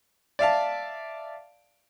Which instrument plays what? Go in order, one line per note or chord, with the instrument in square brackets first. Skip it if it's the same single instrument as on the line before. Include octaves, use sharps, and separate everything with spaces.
[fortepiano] D5 E5 F5 A5